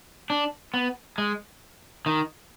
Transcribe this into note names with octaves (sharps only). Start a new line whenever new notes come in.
D4
B3
G#3
D#3